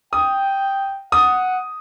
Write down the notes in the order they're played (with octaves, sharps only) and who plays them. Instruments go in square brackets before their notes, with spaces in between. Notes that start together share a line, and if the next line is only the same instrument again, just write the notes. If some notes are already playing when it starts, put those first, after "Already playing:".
[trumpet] G5 [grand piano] D#6
[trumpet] F#5 [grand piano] D#6